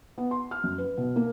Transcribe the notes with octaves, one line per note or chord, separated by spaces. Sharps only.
B3
C6
F6
F#2
B4
B2
A#3